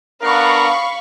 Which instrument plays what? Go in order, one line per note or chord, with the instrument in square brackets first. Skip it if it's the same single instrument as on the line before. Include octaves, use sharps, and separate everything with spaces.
[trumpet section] B3 D4 A#4 [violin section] F5 B5 C#6